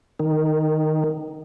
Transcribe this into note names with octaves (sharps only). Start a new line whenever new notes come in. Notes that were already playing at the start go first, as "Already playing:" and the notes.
D#3